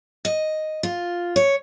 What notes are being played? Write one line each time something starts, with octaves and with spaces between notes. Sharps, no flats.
D#5
F4
C#5